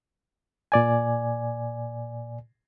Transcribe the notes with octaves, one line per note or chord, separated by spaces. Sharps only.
A#2 D5 G#5